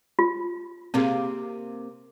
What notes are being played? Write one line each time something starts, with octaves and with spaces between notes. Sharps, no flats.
F4
C3 A#3 C4 G#4